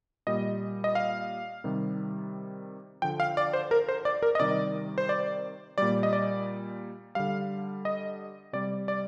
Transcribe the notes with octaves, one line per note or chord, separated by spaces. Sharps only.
A#2 G3 D#5
D#5
F5
C3 D#3 G3
D3 F3 G5
F5
D5
C5
A#4
C5
D5
A#4
D#5
C3 D#3 G3 D5
C5
D5
A#2 G3 D5
D#5
D5
D3 G3 F5
D#5
C3 G3 D5
D5